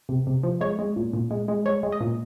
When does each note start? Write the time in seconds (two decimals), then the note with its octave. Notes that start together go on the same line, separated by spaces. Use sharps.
0.09 C3
0.27 C3
0.43 F3
0.61 G#3 C#5
0.79 G#3
0.96 A#2
1.13 A#2
1.31 G#3
1.48 G#3
1.66 G#3 C#5
1.83 G#3
1.92 D#5
2.01 A#2